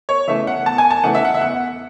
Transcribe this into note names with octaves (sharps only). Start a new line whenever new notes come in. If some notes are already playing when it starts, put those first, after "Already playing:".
C#5
C#3 E3 A3 E5
F#5
E2 A5
G#5
A5
C#3 E3 A3 F#5
E5
F#5
E5
E2 F#5